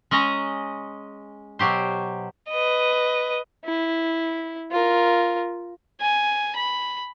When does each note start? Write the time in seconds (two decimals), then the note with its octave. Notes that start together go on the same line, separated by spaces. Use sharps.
0.11 G#3 C#4 D#5 A#5
1.59 B2 F#3 G4 C5
2.49 B4 D#5
3.65 E4
4.71 F4 A#4
6.01 G#5
6.56 B5